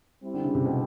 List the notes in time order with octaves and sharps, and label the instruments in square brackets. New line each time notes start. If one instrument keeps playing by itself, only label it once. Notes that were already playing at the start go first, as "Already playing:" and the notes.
[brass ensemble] G3 C4 E4 G4
[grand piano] D3
C#3
C3
B2